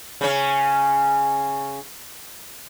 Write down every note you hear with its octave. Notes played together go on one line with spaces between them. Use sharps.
C#3 C#4